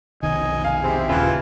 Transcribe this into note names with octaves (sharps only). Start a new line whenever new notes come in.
F1 B1 D#3 D#5 G#5
F5 G#5
C4 E4 G4 G#4
D#1 C#3 E3 E4 F4